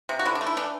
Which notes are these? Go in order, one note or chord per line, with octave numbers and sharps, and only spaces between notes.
C3
F#4
D3 E4
D4
A3
E4
E3 D4